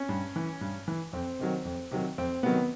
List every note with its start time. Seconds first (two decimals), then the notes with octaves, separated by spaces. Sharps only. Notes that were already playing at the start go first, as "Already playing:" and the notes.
Already playing: C#4
0.09 G2
0.36 E3
0.61 G2
0.88 E3
1.13 F2 C4
1.39 C3 D#3 F#3
1.65 F2
1.91 C3 D#3 F#3
2.18 F2 C4
2.43 C3 D#3 F#3 B3